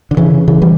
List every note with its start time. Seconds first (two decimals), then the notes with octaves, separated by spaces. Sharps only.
0.11 D3
0.17 C#3 E3
0.48 C#3 E3
0.62 E3 G3